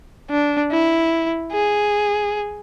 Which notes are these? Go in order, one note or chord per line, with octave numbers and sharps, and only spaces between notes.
D4
E4
G#4